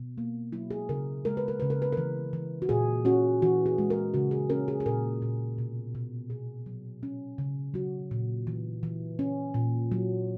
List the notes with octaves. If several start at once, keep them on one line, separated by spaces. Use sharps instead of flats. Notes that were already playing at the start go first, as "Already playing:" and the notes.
Already playing: B2
A#3
F#3 E4
G#4
C#3 A#4
G#3 A#4
B4
A#4
C#3 B4
A#4
B4
E3 A#4
E3
F#4
A#2 G#4
C#4 F#4
E3 F#4
G#4
G#3
A#4
C#3 F#4
G#4
C#4 A#4
G#4
G#4
A#2 A#4
A#2
B2
B2
B2 G#4
F#3
C#4
C#3
F#3 F#4
A#2
E3
E3
C#4
A#2
F#3